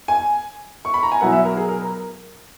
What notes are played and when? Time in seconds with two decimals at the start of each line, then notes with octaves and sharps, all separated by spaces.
0.08 G#5
0.85 C#6
0.94 B5
1.03 A#5
1.12 G#5
1.21 B2 F#3 B3 E4 F#5
1.32 E5
1.45 A#4
1.57 G#4
1.69 A#4
1.84 A#4